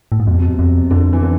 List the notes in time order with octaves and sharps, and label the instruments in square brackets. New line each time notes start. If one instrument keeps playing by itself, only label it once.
[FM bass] A2
G#2
[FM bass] F2 [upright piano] B2
[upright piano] C3
B2
[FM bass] F2 [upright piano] C3
[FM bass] F2 [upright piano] D3
[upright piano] E3
D3